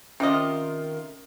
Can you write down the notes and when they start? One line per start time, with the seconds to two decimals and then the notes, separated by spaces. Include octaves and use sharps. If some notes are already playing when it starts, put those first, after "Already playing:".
0.20 C3 D#3 C#4 F4 A#4 D#5 D6